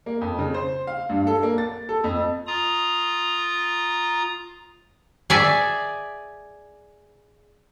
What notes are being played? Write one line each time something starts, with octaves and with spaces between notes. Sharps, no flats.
A#3
F2
C#3
C5
F5
G2
A4
A#3
A6
A4
F2
F4 A#5 D#6
G#4 D5 E5